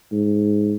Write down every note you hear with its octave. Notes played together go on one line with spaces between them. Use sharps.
G#2